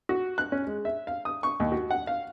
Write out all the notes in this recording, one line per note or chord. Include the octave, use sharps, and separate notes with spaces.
F#4
F#6
C#4
G#3
E5
F5
D#6
C#6
D#2
F#4
F#5
F5